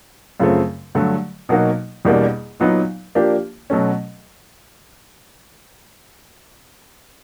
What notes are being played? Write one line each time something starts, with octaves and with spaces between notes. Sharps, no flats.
F#2 C#3 F3 A3 C4
G2 D3 F#3 A3
B2 F#3 A#3 D#4 F#4
E2 B2 G3 A#3 D4
A#2 F#3 B3 D#4
F3 A#3 D4 G4
B2 F#3 A3 C#4